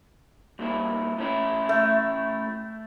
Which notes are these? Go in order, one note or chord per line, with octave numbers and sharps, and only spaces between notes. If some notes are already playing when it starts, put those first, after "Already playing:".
G2 A#2 E4
A2 C#4 E4
A3